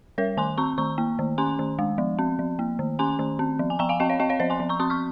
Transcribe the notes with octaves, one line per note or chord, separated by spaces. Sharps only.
G3 A#4 C#5
D#3 G#5 C6
C4 A#5 C#6
D#3 A#5 C#6
A#3
D#3
C#4 G#5 C6
D#3
G#3
F3
C4
F3
A#3
D#3
C#4 G#5 C6
D#3
C4
F3
G#5
F3 G5 A#5
F5 G#5
C4 D#5 G5
C#5 F5
C4 D#5 G5
C#5 F5
F3 C5 D#5
G#5 C6
F3
A#5 C#6
C4 C6 D#6
C#6 F6